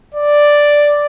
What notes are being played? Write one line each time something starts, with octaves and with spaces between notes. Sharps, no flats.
D5